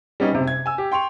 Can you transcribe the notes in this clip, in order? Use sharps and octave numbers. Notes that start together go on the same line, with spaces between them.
G3 B3 C#4 D#4
F#1 C3
G#6
G#5 E6
G4
G5 C6 C#6 F7